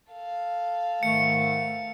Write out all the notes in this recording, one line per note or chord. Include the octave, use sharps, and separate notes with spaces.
A4 F5
G#2 D#3 A3 C#7